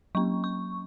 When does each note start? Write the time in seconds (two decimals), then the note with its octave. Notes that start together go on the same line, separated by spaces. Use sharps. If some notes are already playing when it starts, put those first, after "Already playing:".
0.15 F#3 A#3 C#4 C#6
0.44 C#6